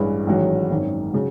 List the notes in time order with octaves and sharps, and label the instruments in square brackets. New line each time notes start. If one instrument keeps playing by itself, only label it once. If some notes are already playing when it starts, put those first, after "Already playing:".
Already playing: [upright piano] A1 G2 E3 G#3
A1 G#2 D#3 F#3
G#1 F#2 D#3
C#3 F#3